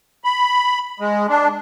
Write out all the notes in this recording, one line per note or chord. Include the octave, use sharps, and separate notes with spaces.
B5
G#3
D4